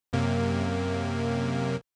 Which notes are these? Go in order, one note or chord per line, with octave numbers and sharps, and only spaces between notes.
F#2 C3 A#3